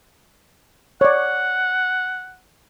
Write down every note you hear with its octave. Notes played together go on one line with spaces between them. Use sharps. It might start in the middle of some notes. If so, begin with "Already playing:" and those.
C#5 D5 F#5